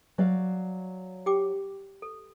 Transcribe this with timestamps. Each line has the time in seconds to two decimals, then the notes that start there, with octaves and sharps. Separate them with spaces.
0.18 F#3 D5 F5
1.26 G4 G5 D6
2.02 A4